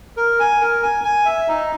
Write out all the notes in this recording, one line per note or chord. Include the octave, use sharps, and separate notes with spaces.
A#4
G#5
A#4
G#5
G#5
E5
D#4